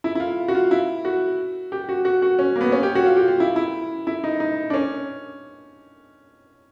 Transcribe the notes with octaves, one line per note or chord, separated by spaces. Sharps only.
E4
E4
F4
F#4
F4
E4
F#4
G4
F#4
F#4
F#4
C#4
A#3
B3
C#4
G4
F#4
F4
G4
F4
E4
E4
E4
D#4
D#4
D4
C#4